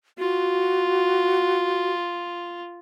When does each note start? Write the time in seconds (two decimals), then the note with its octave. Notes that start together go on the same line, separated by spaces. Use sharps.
0.18 F4 F#4